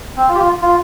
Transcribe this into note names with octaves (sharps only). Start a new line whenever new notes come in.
C4
F4
G4
F4
F4